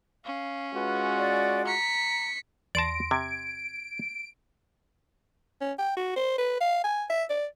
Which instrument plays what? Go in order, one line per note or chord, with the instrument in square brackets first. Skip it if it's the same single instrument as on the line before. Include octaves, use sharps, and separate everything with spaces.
[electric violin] C#4 [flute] F5
[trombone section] G#3 F4 F#4 [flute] B4
[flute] D5
[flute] A#5 [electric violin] B6 C#7
[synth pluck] E2 C6 A#6 [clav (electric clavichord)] D5 A5 [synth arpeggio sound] D7
[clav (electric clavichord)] C3 [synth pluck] G#6
[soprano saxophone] C#4
G5
F#4
C5
B4
F5
G#5
E5
D5